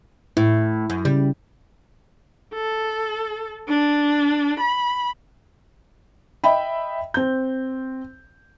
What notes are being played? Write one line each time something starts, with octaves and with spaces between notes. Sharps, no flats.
A2 E4
F#2
C#3 G3
A4
D4
B5
D#5 E5 G5 B5
C4 G6